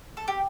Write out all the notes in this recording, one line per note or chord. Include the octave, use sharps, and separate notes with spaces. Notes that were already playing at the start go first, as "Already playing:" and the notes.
A4
G4